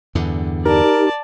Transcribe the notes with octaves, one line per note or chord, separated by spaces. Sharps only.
E2 G2 D3
D#4 G4 A#4 D5 A5